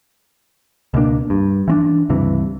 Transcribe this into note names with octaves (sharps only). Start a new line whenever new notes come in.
C#2 B2 A#3 D4
G2
E3 C4 D4
C#2 G2 C3 E3